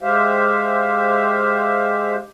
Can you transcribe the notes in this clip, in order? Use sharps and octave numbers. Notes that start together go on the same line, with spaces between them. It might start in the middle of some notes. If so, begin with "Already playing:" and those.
G#3 G4 C5 E5 F5